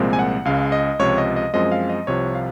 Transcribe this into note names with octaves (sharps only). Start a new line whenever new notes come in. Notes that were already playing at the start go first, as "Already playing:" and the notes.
Already playing: C2 A#2 F3 G#3 C4
G#5
F#5
C#2 C#3 G#3 F5
D#5
C#2 C3 F3 C#5
D#5
D#5
F#2 F3 G#3 C4 D#5
F5
D#5
C2 C3 F3 C#5
F5